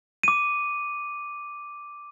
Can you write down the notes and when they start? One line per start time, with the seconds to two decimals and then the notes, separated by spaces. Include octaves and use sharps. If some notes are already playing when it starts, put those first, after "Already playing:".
0.23 D6 D#7